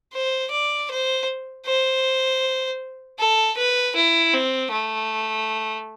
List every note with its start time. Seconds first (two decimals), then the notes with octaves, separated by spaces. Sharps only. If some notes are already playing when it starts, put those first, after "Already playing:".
0.13 C5
0.51 D5
0.90 C5
1.66 C5
3.19 A4
3.57 B4
3.96 E4
4.33 C4
4.72 A3